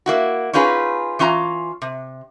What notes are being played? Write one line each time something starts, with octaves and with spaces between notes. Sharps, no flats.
A#3 E4 F#4
C#4 D#4 F4 G#4 B4
E3 C#4 F4 F#5 A#5
C3